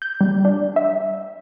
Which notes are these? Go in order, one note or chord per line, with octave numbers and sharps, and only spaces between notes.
G6
G3
D4
E5